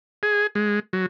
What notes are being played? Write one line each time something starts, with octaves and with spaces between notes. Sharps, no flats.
G#4
G#3
F#3